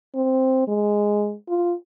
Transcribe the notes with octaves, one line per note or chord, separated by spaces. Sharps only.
C4
G#3
F4